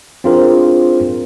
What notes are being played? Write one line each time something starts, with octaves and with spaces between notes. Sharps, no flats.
C4 D4 F4 G#4 A#4 C5